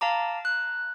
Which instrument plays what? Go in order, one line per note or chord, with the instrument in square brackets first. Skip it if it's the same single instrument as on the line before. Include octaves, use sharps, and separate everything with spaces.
[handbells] F5 A5 A#5 D6
F#6